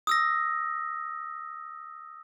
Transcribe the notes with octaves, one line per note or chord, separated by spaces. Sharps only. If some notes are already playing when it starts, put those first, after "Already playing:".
D#6 E6 A#6